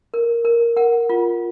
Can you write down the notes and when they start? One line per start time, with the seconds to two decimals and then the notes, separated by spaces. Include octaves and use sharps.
0.14 A#4
0.45 A#4
0.77 A#4 F#5
1.09 F4